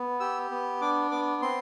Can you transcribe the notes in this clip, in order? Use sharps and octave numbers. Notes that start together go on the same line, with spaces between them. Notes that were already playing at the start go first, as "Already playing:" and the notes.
Already playing: B3
G4 E6
B3
D4 D6
B3 D6
C4 C6